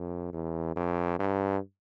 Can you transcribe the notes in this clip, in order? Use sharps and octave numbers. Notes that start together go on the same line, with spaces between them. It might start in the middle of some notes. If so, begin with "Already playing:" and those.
Already playing: F2
E2
F2
G2